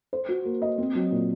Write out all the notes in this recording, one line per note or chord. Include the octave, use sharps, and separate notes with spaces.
C5
F#4
A#3
D#5
C4
F#3
A#2